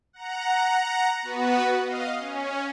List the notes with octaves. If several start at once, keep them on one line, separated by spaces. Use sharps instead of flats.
F#5 A#5
B3 F#4 B4
D#5 F5
C#4